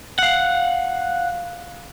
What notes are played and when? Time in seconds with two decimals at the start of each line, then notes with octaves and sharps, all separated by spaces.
0.19 F5 F#5